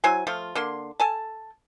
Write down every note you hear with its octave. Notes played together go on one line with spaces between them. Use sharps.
F#3 E4 C5 G#5
F3 A3 F4
D3 A#3 C6
A4 G#5 A5